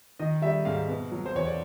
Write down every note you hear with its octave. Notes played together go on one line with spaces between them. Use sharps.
D#3 D#5
G3 E5
G#2 F5
B2
F#3
C5
E2 C#5
D5